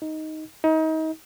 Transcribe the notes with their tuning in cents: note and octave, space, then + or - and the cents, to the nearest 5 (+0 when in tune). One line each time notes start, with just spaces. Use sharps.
D#4 +5
D#4 +30